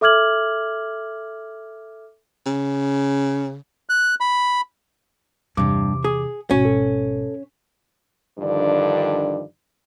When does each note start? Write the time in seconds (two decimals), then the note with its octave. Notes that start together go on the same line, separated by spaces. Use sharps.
0.01 A4 E5 D6 F6 G#6 F#7
2.46 C#3
3.89 F#6
4.20 B5
5.57 E2 G2 C3 D6
6.04 G#4
6.51 G#1 B2 C#4 F#4
6.65 A4
8.39 G2 D3 D#3 F3 D5